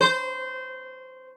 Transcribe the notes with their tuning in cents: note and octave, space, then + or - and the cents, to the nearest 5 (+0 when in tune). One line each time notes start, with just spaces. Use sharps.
C5 -20